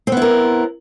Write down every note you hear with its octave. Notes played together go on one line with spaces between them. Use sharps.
B3 C4 E4 A#4